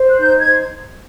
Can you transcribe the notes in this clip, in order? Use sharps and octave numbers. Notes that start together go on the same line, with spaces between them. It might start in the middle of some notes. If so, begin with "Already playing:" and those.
Already playing: C5
F#6
D#4 G6
G#6
C5